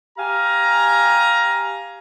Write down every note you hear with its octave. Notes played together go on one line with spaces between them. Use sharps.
G4 F5 G#5 A#5